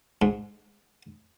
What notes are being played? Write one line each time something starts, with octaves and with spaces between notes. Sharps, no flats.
G#2